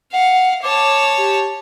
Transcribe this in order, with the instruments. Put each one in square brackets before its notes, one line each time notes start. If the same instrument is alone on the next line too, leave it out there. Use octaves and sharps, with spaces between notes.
[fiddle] F5 [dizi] F#5
[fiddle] C#5 A5 [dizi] D6
[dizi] G4